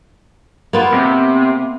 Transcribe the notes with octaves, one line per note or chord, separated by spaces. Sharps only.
A#3 B3 F4
C3